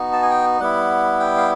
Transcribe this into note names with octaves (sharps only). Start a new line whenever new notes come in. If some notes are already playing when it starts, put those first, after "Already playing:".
Already playing: B3 D#4 F#4
A5
G#5
G5
G3 B3 E4 F#5
G5
F5